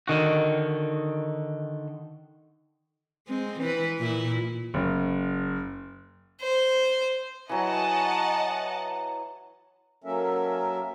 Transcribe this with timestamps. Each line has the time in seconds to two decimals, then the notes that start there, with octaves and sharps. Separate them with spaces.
0.08 D3 D#3 F#4
3.27 G#3 C4
3.60 E3 B4
3.99 A#2 E4
4.74 F#1
6.41 C5
7.49 E3 F#3 D#5 F#5 A5
10.04 F#3 A#3 C#4 A4 A#4 E5